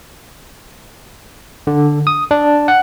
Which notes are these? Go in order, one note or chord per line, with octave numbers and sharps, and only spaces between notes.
D3
D#6
D4
F#5